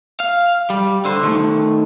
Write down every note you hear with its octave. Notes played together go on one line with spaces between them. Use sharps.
F5
G3
D3 C5
D#3 A3